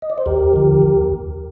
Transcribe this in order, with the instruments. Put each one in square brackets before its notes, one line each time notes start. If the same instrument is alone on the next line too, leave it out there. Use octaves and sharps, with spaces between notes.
[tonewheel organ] D#5
D5
C5
D#2 G4 A#4
D3 F3
D#2